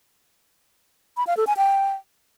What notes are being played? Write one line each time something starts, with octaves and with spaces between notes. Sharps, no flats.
B5
F5
A4
G#5
G5